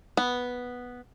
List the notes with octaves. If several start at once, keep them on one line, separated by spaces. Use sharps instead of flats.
B3